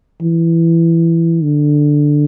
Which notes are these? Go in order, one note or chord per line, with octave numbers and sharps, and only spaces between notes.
E3
D3